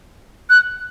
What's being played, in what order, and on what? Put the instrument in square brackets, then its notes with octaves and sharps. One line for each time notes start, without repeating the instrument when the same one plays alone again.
[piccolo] F#6